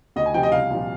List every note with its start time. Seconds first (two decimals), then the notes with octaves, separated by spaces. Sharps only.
0.16 D2 D#5
0.26 G#5
0.34 C3 F3 G5
0.43 D#5
0.52 C2 F5
0.71 A#2 F3